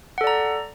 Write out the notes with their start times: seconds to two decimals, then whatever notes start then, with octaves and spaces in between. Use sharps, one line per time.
0.18 F#5
0.21 A4
0.24 D5
0.27 A#5